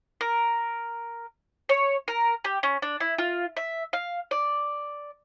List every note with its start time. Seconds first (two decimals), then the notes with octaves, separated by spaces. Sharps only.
0.21 A#4
1.69 C#5
2.08 A#4
2.45 G4
2.63 C#4
2.82 D4
3.00 E4
3.18 F4
3.57 E5
3.93 F5
4.31 D5